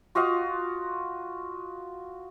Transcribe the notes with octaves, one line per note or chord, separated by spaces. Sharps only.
F4 F#4 D#5 F5